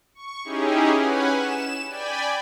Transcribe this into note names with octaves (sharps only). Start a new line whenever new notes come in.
C#6
C#4 D#4 E4 G4 G#4
C#4 B4 F#5 G#5
E7
D5 G5 G#5 B5